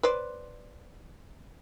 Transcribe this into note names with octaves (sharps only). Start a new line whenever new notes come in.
B4 C5 D5